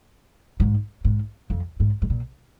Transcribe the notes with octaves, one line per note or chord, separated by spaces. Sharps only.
G#2
G#2
F2
G#2
G#2
A#2